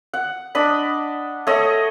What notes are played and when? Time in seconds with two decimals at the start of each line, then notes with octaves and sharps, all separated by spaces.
0.14 F#5
0.55 D4 D#5 B5
1.47 A3 C#5 D#5